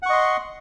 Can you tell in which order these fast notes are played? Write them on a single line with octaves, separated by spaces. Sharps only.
F#5 C#6 D#5 C6